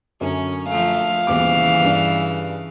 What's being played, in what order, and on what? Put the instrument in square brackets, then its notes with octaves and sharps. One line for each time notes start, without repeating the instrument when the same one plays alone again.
[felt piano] F#2 D3 [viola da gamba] C#4
[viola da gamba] F3 A3 [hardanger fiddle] F5
[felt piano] D#1 E2 D6 [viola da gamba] C#3 E3
[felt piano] G2 D4